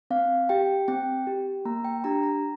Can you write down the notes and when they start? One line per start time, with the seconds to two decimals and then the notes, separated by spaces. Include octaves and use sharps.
0.10 C4 F5
0.49 G4 G5
0.88 C4 G5
1.27 G4
1.65 A#3 A#5
1.85 G5
2.04 D4 G4 A#5
2.23 A#5